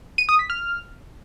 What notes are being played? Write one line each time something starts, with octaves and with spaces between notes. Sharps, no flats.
D#7
D#6
B6
F6